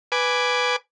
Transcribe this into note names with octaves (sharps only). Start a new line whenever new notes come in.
B4 G#5 D6